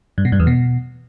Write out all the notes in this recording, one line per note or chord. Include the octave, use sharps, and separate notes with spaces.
G2
B2
G2
E2
B2